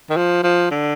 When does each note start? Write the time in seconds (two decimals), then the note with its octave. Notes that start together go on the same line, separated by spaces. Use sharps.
0.10 D#3
0.17 F3
0.43 F3
0.71 D3